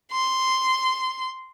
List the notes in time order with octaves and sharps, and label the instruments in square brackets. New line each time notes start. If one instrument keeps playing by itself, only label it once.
[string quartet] C6